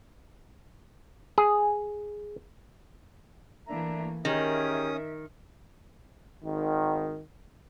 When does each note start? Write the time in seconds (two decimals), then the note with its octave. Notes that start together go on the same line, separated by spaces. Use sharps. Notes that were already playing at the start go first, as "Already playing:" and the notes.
1.38 G#4
3.68 E3 A3 A#3 D4 E5 A#5
4.25 D#3 C#4 G4 G#4 A#4 E5 D#6
6.43 G#1 D#3